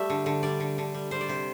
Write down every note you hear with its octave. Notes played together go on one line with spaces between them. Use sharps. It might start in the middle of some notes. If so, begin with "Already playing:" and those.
Already playing: G3 A3 E5
D3
D3
G3 D5
D3
D3
G3
G3 C5
D5
C3 C5